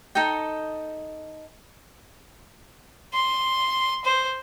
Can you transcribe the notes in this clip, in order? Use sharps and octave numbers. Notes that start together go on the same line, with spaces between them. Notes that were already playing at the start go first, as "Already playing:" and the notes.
D#4 A4 D#5 G5
C6
C5